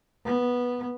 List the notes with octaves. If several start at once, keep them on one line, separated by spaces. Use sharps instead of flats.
B3